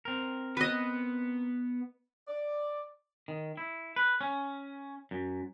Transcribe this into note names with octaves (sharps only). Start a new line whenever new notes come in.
C4 A#4
B3 B4 D#5
D5
D#3
E4
B4
C#4
F#2